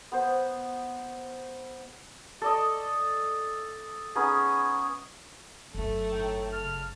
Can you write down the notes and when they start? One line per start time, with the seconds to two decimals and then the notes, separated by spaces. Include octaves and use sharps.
0.12 B3 C5
2.42 A4 D5 D#5
4.15 B3 C#4 D#4 G#4
5.75 G1 F#2 A3
6.11 A2 D#4 G5
6.52 C#3 A5 F6